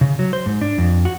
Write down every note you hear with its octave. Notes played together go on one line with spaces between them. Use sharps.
C#3
F#3
C5
G#2
D4
F2
F#4